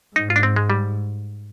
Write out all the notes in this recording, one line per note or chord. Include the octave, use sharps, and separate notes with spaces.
G#2 D#4
F4
D4
C4
G#3
G3